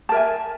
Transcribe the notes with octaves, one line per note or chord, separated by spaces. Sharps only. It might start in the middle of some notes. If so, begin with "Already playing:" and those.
A#4 E5 G#5 A5